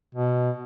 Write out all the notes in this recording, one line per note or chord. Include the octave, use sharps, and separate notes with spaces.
B2